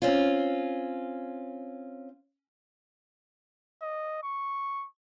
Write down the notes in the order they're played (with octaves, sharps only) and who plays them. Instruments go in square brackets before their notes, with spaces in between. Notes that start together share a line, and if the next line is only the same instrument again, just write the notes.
[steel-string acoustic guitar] C4 C#4 F4
[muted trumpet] D#5
C#6